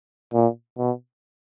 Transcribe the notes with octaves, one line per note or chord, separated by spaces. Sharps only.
A#2
B2